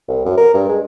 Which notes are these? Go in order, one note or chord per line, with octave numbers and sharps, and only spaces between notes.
C2
F#2
A#4
G2
G#3